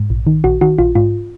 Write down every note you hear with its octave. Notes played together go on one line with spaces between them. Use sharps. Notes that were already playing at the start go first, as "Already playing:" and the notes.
Already playing: G#2
A#1
D#3
A#1 F#4
D#3 F#4
A#1 F4
G#2 F4